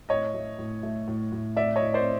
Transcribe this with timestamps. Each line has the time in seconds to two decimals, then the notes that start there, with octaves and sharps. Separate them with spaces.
0.09 A2 C#5 D#5
0.34 A3
0.58 A2
0.83 A3
1.08 A2
1.32 A2
1.56 A2 D5 E5
1.76 C#5 D#5
1.82 A2
1.94 C5 D5